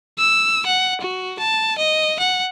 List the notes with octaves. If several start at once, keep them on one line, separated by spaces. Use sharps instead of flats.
E6
F#5
F#4
A5
D#5
F#5